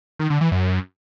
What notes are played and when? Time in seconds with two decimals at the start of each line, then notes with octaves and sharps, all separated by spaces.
0.19 D#3
0.30 D3
0.41 E3
0.52 F#2